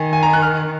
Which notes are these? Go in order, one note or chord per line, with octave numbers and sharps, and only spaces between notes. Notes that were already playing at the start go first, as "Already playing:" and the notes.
Already playing: D#3 G#5
G#5
A#5
F#6
F6